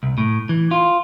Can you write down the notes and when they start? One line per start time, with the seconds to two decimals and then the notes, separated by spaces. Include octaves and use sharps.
0.03 C2
0.18 A2
0.49 E3
0.71 F4